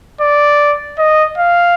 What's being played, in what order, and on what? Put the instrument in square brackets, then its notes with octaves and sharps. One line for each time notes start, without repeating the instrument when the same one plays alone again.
[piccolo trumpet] D5
D#5
F5